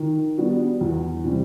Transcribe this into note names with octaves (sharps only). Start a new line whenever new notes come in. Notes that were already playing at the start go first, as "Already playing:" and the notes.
Already playing: D#3
G3 B3 D4 F#4
E2
C3 E3 G3 C4